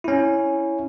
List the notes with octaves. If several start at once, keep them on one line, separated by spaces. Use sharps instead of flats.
C#4 E4